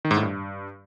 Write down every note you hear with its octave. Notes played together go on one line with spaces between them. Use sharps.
D#3
G#2
A2
G2